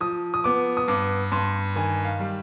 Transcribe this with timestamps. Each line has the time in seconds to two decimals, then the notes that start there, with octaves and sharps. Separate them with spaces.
0.01 F3 D#6
0.34 D#6
0.44 B3 D6
0.77 D#6
0.88 G2 D6
1.32 G2 C6
1.76 D#3 G#5
2.05 F5
2.19 G3